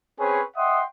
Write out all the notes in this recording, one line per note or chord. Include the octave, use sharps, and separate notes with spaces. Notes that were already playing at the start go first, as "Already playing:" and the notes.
C4 C#4 G#4 B4 C#5
D#5 E5 F#5 G5 C6 D#6